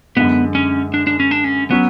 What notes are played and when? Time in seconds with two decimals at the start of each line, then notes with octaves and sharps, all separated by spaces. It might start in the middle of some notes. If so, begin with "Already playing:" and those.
0.16 F#2 D3 G#3 B3
0.55 C#4
0.94 D4
1.07 D4
1.20 C#4
1.31 D4
1.44 C#4
1.71 F#3 B3 C#4